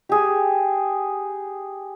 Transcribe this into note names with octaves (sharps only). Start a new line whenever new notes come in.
G4 G#4